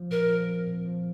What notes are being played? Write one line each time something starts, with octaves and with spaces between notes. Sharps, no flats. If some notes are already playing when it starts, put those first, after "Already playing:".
Already playing: F3
A#2 A#4
F3
C4
A#2
F3